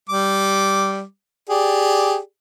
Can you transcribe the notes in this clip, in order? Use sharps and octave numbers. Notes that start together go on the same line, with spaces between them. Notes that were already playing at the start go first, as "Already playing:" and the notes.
G3 D6
G4 G#4 D5